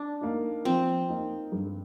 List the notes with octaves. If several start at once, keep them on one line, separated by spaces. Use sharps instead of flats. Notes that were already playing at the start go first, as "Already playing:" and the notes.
Already playing: D4
A#3 D#4
F3 C4
A#3 D#4
G2